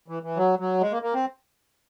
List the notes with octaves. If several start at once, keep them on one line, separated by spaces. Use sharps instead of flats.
E3
E3
F#3
F#3
G#3
A#3
A#3
C4